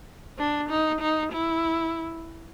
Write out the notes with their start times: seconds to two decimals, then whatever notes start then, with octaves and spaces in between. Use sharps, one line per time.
0.38 D4
0.70 D#4
1.01 D#4
1.32 E4